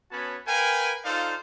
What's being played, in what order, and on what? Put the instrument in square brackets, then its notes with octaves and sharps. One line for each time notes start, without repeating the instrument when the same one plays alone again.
[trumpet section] B3 C#4 F#4 C#5 A5 B5
A#4 B4 F5 G5 G#5
D#4 F4 A4 C5 D5 F5